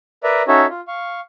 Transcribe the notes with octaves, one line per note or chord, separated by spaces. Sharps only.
A#4 B4 D5 E5 A#5
C#4 D#4 F#4 A4 C#5 E5
F4
F5 C#6